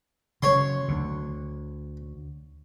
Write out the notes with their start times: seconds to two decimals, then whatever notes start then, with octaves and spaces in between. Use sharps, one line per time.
0.43 C#3 F#3 C#5 C6
0.88 D2 D3